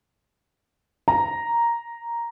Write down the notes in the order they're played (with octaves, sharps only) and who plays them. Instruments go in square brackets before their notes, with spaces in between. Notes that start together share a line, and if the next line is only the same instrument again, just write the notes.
[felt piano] A#5